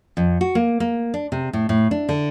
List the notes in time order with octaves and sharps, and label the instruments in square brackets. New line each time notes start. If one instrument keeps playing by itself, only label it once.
[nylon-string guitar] F2
F#4
A#3
A#3
D4
C3
A2
A2
D4
D3